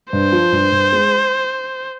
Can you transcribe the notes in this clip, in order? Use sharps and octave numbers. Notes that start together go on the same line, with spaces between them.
G2 C5
F3
G2
G2
G#3